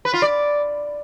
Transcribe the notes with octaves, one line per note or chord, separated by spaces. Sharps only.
B4
F4
D5